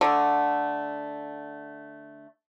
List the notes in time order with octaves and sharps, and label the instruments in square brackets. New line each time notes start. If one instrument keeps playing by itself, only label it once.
[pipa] D3 A3